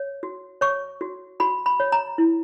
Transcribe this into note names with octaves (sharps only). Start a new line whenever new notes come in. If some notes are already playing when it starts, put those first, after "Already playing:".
Already playing: C#5
F#4
C#5 C#6
F#4
F#4 B5
B5
C#5
A#5
E4